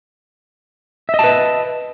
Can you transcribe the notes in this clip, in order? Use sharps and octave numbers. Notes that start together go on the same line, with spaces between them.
B4 D#5 E5 A5